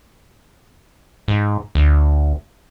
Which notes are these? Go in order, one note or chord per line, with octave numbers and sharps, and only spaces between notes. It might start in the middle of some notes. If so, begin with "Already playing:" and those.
G#2
D2